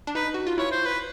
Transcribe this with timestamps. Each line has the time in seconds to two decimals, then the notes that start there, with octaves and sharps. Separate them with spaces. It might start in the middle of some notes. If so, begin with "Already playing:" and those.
0.07 D4
0.15 D#4 B4
0.34 F#4
0.47 F4
0.58 E4 C#5
0.72 C5
0.85 B4